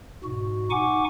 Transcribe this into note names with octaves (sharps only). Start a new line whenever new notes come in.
G#2 B2 F#4
D#4 F#5 G#5 C#6 D6